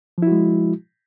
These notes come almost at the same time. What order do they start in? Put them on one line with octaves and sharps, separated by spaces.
F3 E4 F#4 G#3